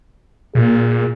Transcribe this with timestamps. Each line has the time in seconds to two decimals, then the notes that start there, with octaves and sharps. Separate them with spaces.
0.55 A#2 G#4